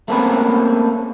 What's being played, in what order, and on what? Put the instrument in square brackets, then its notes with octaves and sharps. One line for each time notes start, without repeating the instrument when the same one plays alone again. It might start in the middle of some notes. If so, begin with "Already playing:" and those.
[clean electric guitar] A3 A#3 C4 C#4 B4